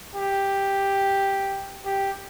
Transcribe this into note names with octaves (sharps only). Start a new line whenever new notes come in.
G4
G4